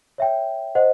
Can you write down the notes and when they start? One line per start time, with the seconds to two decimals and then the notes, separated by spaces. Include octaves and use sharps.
0.18 C#5 E5 G5
0.75 C5 D#5 F#5